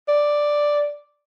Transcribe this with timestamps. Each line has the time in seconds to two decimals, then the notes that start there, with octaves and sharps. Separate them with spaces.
0.08 D5